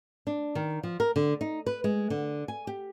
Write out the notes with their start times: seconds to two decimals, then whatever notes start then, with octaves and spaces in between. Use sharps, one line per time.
0.27 D4
0.55 D#3
0.83 F3
1.00 A#4
1.16 D3
1.41 D#4
1.66 B4
1.84 G#3
2.10 D3
2.48 G#5
2.67 G4